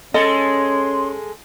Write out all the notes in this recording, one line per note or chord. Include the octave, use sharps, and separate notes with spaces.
G#3 C#4 A4 D#5 C6